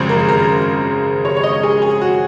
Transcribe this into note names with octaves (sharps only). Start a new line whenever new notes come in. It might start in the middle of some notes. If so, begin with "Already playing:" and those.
Already playing: G#1 F#2 C#3 F3 G#3 C5
A#4
A#4
C#5
C#5
D#5
G#4
G#4
F#4